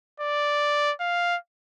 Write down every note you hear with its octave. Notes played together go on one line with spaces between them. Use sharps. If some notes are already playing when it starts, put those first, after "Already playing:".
D5
F5